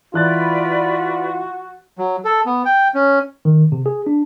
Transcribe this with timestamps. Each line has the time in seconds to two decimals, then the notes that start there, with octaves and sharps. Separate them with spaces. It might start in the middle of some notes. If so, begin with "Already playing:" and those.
0.14 E3 F4 F#4 B4 D5 F#6 A6
1.98 F#3
2.25 A4
2.46 B3
2.65 G5
2.94 C#4
3.45 D#3
3.72 C3
3.86 G#4
4.07 D4